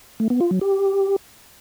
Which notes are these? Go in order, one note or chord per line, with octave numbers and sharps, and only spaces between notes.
A3
B3
F4
F#3
G4